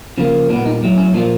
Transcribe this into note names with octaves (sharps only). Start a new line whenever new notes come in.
C#3 F3 A#3
A#2 G3 B3 D4
D#4
A2 F#3 A3
C#4
A#2 F3 A#3 D4